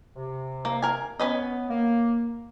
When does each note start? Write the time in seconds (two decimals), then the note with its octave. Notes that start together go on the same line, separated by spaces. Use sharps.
0.16 C3
0.65 A#3
0.82 A#4 G#5
1.19 B3 C#4 B4 D#5
1.69 A#3